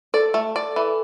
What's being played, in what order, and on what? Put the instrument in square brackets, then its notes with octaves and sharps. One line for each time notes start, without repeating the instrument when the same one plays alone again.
[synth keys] A4 [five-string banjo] D5
[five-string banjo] A3
D5
E3